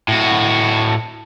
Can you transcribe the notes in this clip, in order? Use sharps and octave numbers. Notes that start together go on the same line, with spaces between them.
A2 F#4